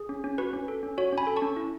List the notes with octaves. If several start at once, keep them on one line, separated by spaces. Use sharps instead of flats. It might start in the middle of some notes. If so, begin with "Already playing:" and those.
Already playing: G#4
C#4
C#4
F#4 B4
C#4
A4
C#4
F#4 C#5
C#4 G#5 B5
A4
A5 C#6
C#4
E4